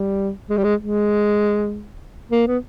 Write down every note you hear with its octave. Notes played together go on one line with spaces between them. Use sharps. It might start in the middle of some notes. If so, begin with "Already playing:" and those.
Already playing: G3
G#3
G3
G#3
G#3
A#3
B3